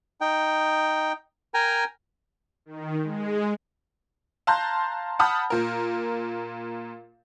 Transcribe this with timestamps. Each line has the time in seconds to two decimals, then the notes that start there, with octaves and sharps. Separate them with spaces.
0.21 D#4 G5
1.54 A#4 G5 G#5 A#5
2.66 D#3
3.03 G#3
4.47 F5 A5 A#5 C6 F#6 G6
5.19 F#5 A5 B5 D#6 F6 G6
5.50 A#2 A#4